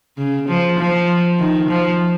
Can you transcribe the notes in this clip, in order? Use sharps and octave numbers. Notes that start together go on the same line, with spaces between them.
C#3
F3
F3
D#3
F3